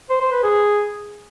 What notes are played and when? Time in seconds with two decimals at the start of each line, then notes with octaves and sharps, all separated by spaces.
0.10 C5
0.21 C5
0.32 B4
0.43 G#4